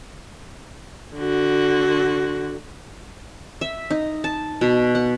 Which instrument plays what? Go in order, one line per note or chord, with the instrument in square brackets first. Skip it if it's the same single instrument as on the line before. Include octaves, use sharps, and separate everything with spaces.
[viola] D3 F#4
[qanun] E5
D#4
A5
B2
F#5